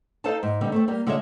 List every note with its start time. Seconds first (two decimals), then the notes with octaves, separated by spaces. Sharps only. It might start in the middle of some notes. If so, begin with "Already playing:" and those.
0.24 D#4 A4 C5 D#5 F5 A5
0.43 G#2
0.61 D3 G3 C4 D#4
0.72 A3 A#3 C4
0.88 G3 A#3 G4
1.07 D3 G#3 F4 G#4 C#5 E5